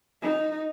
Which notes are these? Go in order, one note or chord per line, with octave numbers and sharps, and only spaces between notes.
D#4